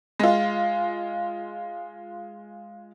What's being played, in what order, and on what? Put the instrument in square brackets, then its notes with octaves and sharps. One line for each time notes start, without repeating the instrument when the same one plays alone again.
[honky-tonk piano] G#3 F4